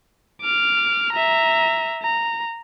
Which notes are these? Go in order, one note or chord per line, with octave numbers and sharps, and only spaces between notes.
D6 F6
E5 A#5
A#5